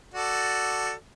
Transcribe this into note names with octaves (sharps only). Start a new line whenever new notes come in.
F#4 A4 D5